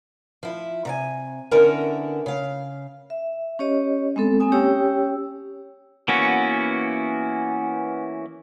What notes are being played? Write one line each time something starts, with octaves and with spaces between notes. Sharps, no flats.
F3 E4
C3 D5 G#5
D3 B3 C#4 E4 A#4
C#3 F5
E5
C#4 G4 C#5 D#5
G#3 B3 C4 A4
A#3 C4 G#5 D#6
C#4 G4 C#5 G5 E6
E3 A#3 B3 C#4 F#4